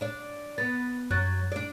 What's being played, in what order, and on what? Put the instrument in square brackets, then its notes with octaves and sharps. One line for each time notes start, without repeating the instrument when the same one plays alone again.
[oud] D4 D5
[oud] B3 [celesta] A6
[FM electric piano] F#2 [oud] F#3 [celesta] F#6 A6
[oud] D4 D5